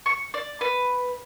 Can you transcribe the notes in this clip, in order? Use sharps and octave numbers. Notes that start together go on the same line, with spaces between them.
C#6
D5
B4